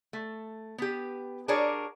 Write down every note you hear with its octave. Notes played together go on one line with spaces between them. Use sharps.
A3
B3 G4
D4 F#4 G#4 A#4 C#5 D5